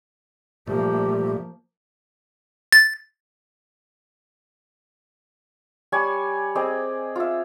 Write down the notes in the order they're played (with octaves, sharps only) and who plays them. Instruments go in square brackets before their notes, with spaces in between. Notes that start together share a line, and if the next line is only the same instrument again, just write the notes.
[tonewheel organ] A#2 G3 A3 [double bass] F3 A#3 [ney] G4
[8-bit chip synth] A6
[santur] G3 C#5 D5 G#5
C4 G#4 D5 D#5
F4 E5